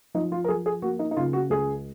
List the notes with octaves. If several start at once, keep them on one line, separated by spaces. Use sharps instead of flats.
F3 D#4
F4
A#4
F3 G#4
G#4
A#3 F#4
D#4
D#4
C#3 F4
F#4
C#2 G#4